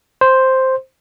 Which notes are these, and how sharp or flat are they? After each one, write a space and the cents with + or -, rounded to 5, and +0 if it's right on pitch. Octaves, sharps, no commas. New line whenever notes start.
C5 +0